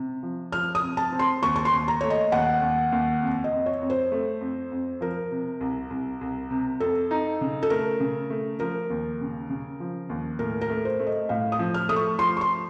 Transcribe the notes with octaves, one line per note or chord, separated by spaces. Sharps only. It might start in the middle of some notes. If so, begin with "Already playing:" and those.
Already playing: C3
F3
F3 F6
D#6
C3
A5
C4
C6
D#2 C#6
C#6
C6
D#2
A#5
A3 C#5
D#5
D#2 F#5
D#2
D#2
F2
D#5
F2
C#5
F2
C5
A3
F2
F2
F3 A#4
C3
C2
C2
C2
C3
F2 A4
D#4
C#3
A4
A3 A#4
C#3
A3
F3 A#4
D#2
C#3
C#3
F3
D#2
A2 A#4
A#4
A3
C5
A3
D#5
A2 F5
D#6
F3
F6
A3 D#6
C#6
F3 C6
C#6
C6